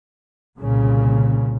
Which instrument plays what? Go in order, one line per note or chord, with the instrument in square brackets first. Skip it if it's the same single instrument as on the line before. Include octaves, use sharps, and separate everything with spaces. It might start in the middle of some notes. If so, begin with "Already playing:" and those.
[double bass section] C2 A#2 C#3